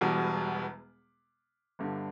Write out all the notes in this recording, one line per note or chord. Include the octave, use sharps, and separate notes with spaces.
E1 E2 B2 G3
G1 G2 D3